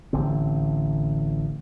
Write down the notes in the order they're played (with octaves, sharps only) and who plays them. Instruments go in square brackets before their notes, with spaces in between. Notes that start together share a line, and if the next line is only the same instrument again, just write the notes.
[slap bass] A1 D3 C4